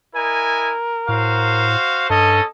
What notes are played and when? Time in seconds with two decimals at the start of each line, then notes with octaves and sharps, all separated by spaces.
0.15 E4 A#4 D#5 G#5
1.09 A2 F#4 C5 F5
2.10 G2 C#4 A4 D#5